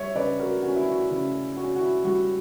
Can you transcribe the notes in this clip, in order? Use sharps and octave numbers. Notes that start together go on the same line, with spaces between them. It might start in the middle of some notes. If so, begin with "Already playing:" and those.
Already playing: G3 C#5 E5
C#3 B4 D5
F#4 A#4
C#4 F#4
E4
F#4
C#3 E4
C#4 F#4
F#4
E4
G3 F#4